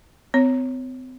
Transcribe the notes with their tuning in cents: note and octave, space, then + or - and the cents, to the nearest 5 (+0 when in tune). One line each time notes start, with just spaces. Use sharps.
C4 -35 C#5 -5